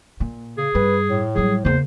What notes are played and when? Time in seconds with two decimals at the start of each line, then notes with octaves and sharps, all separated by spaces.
0.20 A#2
0.58 C#3 G#4
0.75 G2 B4
1.10 A2
1.36 F#3 G3 G#4
1.65 E2 C#3 A#3 C5